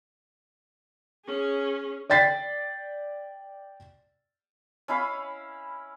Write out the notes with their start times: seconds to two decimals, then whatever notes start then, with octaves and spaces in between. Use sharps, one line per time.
1.25 C#4 G#4
2.10 D5 G5 A6 B6 C7
4.88 C#4 E4 F5 B5